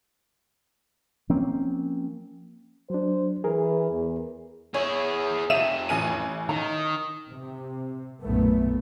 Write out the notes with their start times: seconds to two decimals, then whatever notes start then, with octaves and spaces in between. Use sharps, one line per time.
1.29 F3 A#3 C4 C#4
2.90 F#3 D4 C5
3.44 E3 G#4 A#4
3.91 E2
4.74 E4 G#4 C#5
5.50 F2 C3 E5 D#7 E7
5.89 A1 G#5 D#7
6.49 D#3 A#5
7.30 C3
8.22 B1 F#2 A#2 A3 B3